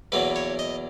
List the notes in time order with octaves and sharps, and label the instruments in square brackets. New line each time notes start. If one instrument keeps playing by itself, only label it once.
[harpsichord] E2 B2 F#3 A#3 B4
C#5
D#5